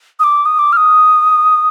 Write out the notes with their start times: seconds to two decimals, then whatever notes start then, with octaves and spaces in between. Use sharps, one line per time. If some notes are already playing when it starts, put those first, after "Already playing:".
0.20 D#6
0.24 D6
0.46 D#6
0.59 D6
0.73 F6
0.77 D#6